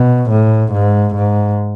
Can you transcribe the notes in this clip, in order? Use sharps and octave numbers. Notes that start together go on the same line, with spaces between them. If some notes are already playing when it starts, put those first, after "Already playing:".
Already playing: B2
A2
G#2
G#2